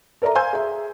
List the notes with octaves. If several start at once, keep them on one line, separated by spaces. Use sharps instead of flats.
A4 A#4 D5 E5 A#5
C5 F5 G#5 C6 E6 G6
G#4 E5